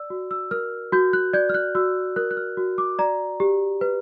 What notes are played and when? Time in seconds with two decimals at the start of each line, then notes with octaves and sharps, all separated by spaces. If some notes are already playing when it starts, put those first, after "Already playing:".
Already playing: D5 E6
0.10 F#4
0.31 E6
0.51 A#4 F6
0.92 F#4 G6
1.13 F#6
1.33 D5 G6
1.49 F6
1.54 F#6
1.75 F#4 E6
2.16 A#4 F#6
2.31 F#6
2.37 F6
2.57 F#4
2.78 D6
2.99 D5 A#5
3.40 G4
3.81 B4